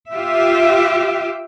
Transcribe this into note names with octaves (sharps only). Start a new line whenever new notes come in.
F4 G4 E5